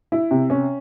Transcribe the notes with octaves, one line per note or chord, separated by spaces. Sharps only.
E4
C3
C#4